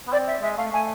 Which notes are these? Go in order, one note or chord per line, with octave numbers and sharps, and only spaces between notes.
B3
C4 D5
E5
G#3 E5
A3 F5
A3 G#5